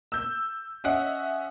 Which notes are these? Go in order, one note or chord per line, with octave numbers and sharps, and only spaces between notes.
E6 G6
C#4 D#5 E5 F#5